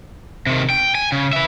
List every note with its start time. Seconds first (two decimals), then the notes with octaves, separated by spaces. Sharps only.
0.46 C3 D#3
0.70 G5
0.95 G#5
1.12 C#3
1.33 B4 E5